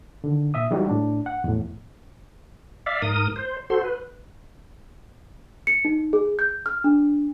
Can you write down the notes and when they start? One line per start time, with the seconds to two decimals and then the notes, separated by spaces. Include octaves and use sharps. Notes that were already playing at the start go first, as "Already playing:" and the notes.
0.24 D3 D#3
0.54 A#2 E5 D#6
0.71 E3 G3 G#3 D#4 F#4
0.89 A2 D4
1.26 F#5
1.44 E2 A2
2.86 D5 E5 F5
3.02 G#2 A#4 D#6
3.36 C5
3.70 F#4 A4 C5 C6
3.84 B4
5.67 C#7
5.85 D#4
6.13 G#4
6.39 G6
6.66 F6
6.84 D4